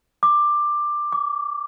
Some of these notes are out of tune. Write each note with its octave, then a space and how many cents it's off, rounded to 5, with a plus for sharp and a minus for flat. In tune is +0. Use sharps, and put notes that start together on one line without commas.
D6 +15
D6 -35